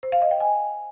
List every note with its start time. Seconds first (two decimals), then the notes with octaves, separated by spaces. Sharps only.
0.03 C5
0.12 F5
0.22 D#5
0.31 G5
0.40 G#5